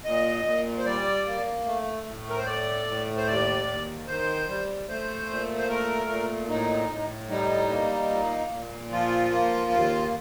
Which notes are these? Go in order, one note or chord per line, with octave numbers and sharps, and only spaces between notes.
A#2 D#5
A#2
C5
G3 D5
A#3
A3
A2
A#4
C5
A3 D5
A2
C5
D#2 D5
D#2
D#3 C5
G3
A3 C5
A#2
C5
A3 A#4
A#2
A2 D#4
A2
G3 D#4
A#3
A#2
A#2
F3 F4
A#3
D#2